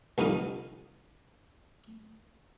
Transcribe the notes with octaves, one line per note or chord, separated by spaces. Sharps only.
C2 F2 D3 D#4 F5